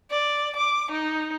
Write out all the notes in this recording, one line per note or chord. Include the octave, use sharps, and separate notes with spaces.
D5
D6
D#4